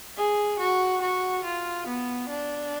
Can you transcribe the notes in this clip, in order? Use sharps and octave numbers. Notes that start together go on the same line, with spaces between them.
G#4
F#4
F#4
F4
B3
D4